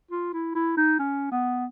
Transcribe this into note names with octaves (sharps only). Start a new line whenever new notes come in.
F4
E4
E4
D#4
C#4
B3